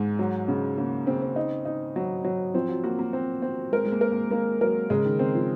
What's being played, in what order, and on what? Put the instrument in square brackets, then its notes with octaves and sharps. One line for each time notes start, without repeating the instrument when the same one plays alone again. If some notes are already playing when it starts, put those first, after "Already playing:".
Already playing: [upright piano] G#2 [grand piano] G#3
[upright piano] F#3
C#3
[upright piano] C#3 [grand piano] A#3
[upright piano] C#3 [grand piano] C4
[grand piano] C4
[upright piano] D#4
D#4
F#3
F#3
[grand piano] F3 [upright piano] C4
[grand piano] F#3
[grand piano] A#3 [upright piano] F#4
[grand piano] A#3
[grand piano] A#3 [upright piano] C4
[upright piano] C4
[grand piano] G#3 [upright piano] A#4
[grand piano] G#3
A#3
[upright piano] A#4
[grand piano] A#3
[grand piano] G#3 [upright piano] A#3
[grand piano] F#3 [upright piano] A#4
[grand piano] C#3 [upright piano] G#3
[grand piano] D#3
[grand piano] D#3 [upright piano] C4
[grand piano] F3